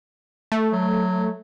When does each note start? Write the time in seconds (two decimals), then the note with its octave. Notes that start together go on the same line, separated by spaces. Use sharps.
0.52 A3
0.72 F#3